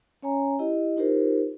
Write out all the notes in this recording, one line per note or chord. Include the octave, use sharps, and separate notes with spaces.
C#4 C#5 G#5 A#5
E4 G4 D#5
D#4 F4 G4 A#4 C5